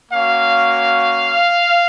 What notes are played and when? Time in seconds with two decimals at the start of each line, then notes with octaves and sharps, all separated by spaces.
0.12 A#3 C#4 F#4 F5